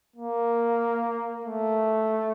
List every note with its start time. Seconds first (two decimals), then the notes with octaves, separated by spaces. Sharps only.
0.16 A#3
1.46 A3